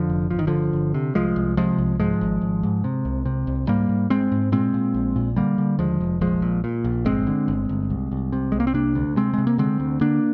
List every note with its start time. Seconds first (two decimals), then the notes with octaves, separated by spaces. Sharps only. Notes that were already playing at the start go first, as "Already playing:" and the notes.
Already playing: F2 D3 F3
0.09 F1
0.30 G1 F3
0.39 D#3
0.47 G1 D3 F3
0.73 G1
0.94 C3
1.15 C2 F3 G#3
1.36 C2
1.57 C3 F3 G#3
1.78 C2
2.00 G#2 F3 G#3
2.21 G#1
2.42 G#1
2.63 G#2
2.84 C3
3.05 C2
3.26 C3
3.47 C2
3.68 G#2 G3 A#3
3.89 G#2
4.10 G#2 G#3 C4
4.32 G#2
4.52 A#2 G#3 C4
4.74 A#2
4.94 A#1
5.16 A#2
5.36 D3 G3 A#3
5.58 D3
5.79 D#2 F3 G#3
6.00 F1
6.21 A#1 F3 G#3
6.42 A#2
6.64 A#2
6.84 A#1
7.05 G1 G#3 C4
7.27 D3
7.48 G1
7.69 G1
7.90 C2
8.12 C2
8.32 C3
8.52 C2 G#3
8.60 A#3
8.67 C4
8.74 C3 A#3 D4
8.95 D2
9.17 C3 G#3 C4
9.34 C3 G#3
9.47 A#3
9.58 D3 G#3 C4
9.80 D2
10.01 D3 A#3 D4